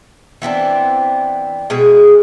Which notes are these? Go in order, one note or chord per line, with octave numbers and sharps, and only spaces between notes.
E3 B3 C4 D4
B2 G#3 G#4